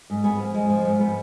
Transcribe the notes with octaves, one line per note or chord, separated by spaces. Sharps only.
G#2
B3 G#4
F3
G#3
F3
G#2
B3